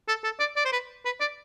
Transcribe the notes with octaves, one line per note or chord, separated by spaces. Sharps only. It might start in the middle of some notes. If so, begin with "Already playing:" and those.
A4
A4
D5
D5
C5
B4
B4
D5